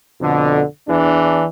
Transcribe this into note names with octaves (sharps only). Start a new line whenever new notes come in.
F2 B2 D3
E2 E3 D4